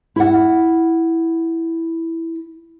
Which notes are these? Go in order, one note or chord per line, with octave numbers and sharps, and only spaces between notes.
E4 F#5